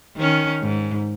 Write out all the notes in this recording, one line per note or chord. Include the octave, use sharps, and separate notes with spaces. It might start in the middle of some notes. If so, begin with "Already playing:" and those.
D#3 C#4
G#2